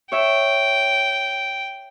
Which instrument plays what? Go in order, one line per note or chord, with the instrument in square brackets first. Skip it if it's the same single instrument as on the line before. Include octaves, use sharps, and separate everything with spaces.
[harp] C#5 E5 [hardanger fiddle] G5